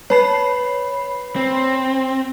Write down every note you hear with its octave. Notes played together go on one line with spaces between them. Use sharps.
B4 C#5 A5 B5 C7
C4